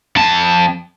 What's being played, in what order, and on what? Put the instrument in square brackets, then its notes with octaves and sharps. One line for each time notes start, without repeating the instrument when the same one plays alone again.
[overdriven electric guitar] F2 A5